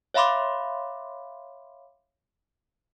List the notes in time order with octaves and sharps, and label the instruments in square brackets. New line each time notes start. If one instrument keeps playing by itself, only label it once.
[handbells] C#5 E5 F5 B5 C6 D6